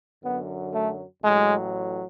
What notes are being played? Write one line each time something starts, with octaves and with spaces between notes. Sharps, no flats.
F#2 D3 F#3 B3
A3
A1 A2 F#3 G#3